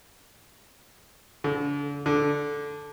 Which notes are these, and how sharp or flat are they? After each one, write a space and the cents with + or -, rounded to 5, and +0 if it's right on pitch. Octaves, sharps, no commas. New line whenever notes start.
D3 -40
D3 -10